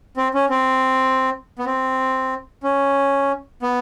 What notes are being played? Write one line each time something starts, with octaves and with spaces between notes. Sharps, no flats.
C4
C#4
C4
B3
C4
C#4
B3